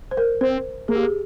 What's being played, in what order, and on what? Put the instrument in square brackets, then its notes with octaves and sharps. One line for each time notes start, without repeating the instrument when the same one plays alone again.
[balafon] C5
A#4
[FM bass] C4 [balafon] C5
[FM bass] A#3 [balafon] G#4
[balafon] G4
G#4